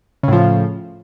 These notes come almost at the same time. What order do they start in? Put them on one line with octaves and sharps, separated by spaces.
C#3 A2 F3